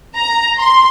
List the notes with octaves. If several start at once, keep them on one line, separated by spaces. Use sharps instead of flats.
A#5
C6